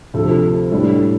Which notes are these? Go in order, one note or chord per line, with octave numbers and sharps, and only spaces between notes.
D2 C3 F3 A4
A2 G3 D4